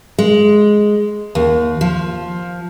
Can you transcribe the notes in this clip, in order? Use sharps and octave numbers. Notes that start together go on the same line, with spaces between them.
G#3
D#2
F3